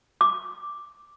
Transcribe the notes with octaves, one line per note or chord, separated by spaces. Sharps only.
D6